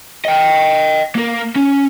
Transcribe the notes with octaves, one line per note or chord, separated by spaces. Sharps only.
D#5 G5
A#3 A#4
C#4